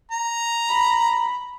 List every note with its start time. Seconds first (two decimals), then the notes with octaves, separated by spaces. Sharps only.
0.11 A#5
0.69 B5